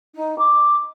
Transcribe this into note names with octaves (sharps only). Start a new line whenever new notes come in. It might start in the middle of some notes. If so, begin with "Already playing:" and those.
D#4
D6